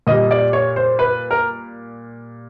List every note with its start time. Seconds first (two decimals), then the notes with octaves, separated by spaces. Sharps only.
0.07 A#2 G3 D#5
0.31 D5
0.53 C#5
0.76 C5
0.99 B4
1.31 A#4